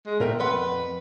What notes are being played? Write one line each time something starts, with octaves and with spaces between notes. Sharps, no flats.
G#3
A#2 A3 A#4 G5
F2 B4 F#5 C6